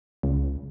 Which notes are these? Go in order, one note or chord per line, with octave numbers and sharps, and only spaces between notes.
C#2